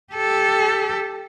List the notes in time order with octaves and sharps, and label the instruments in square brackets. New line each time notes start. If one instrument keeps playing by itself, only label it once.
[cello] G4 A4